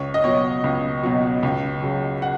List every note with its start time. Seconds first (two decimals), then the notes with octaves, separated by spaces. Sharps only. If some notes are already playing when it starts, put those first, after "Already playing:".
Already playing: C#2 C#5
0.14 D#5
0.24 B2 F#3 C#5
0.64 C#2
1.03 B2 F#3
1.43 C#2
1.83 C#3 F#3
2.22 F#5